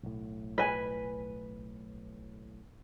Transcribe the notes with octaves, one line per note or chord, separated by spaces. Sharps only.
B1 A2
B4 G#5